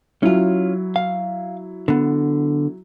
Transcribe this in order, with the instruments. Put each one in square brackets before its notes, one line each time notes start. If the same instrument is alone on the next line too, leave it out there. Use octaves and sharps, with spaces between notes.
[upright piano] F#3 E4 [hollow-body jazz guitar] C#4 F4
[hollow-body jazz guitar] F5
D3 B3